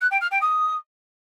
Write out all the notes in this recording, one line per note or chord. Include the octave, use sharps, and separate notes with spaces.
F#6
G5
F6
G5
D#6